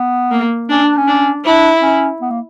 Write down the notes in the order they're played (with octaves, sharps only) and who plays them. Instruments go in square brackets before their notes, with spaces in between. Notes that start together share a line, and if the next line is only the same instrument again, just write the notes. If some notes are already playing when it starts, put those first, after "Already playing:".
Already playing: [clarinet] B3
[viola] A#3
[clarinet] C#4 [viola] D4
[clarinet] D4
C#4
[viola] D4
[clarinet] D4 [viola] E4
[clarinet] C#4
B3
A#3